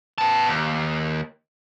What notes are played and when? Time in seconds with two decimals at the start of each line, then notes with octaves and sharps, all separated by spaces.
0.18 B3 A5
0.48 D#2